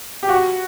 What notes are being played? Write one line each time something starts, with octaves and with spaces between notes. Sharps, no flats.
G4
F#4